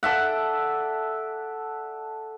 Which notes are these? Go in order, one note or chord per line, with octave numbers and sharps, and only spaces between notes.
A4 D5 E5 F#5